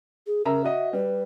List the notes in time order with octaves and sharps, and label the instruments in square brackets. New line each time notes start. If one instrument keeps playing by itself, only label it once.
[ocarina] G#4
[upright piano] C#3 E5 A#5 [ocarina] A#4
[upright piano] F#4 D#5 [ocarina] E5
[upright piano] G3 [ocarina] B4